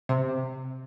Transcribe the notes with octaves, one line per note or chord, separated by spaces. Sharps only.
C3